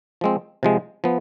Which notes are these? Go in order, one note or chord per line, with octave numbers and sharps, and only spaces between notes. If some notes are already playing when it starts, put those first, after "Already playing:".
F3 G#3 C4
C3 F3 G#3
F3 B3